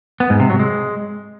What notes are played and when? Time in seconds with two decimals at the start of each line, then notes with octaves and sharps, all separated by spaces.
0.20 B3
0.30 G#2
0.40 C3
0.50 F#3
0.59 G#3